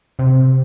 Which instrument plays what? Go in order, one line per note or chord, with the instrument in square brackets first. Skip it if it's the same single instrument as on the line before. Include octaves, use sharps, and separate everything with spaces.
[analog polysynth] C3